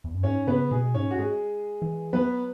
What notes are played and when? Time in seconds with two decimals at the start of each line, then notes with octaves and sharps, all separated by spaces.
0.04 E2
0.14 F#2
0.23 G#2 C#4 C#5
0.47 C#3 B3 B4
0.71 B2 G#3 G#4
0.94 G#2 C#4 C#5
1.11 F#4
1.18 G#3 G#4
1.82 E3
2.13 F#3 B3 B4